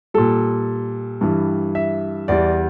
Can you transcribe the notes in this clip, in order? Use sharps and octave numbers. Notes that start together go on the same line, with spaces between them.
A#2 G3 A4
G2 E3 G3
E5
E2 E3 G3 D5